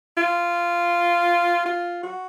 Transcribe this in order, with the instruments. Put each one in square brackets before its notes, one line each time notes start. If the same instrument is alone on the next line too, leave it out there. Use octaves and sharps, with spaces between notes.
[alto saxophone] F4
F4
F#4